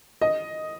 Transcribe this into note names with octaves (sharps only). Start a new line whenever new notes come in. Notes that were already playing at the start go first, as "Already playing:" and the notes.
D#5